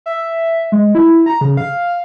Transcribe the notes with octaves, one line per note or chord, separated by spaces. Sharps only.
E5
G#3
E4
A#5
C#3
F5